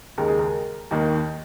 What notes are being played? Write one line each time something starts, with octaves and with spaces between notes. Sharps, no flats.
D#2 C#3 G#3 A#4
G#4
A#4
D#2 D#3 A#3